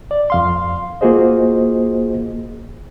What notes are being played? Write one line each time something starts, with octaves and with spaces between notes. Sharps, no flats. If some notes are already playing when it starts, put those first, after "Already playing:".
D5
F2 F5 C6
A#3 F4 F#4 G#4 C5 D#5